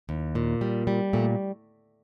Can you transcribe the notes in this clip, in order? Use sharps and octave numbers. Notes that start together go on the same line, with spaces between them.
D#2
A#2
G3
G3
A#2 A3